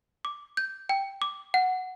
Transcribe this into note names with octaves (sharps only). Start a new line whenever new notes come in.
D6
G6
G5
D6
F#5